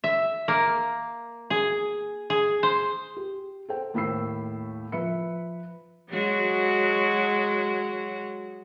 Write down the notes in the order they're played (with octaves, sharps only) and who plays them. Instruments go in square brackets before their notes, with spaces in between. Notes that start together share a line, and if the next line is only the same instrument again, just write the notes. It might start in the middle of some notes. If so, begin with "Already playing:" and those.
[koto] E5
A#3
G#4
G#4
C5
[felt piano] G4
A4 C5 G5
D#2 A2 B5 E6 C7
F3 B4 E5 B5 C#7
[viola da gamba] F#3 G#3 F#4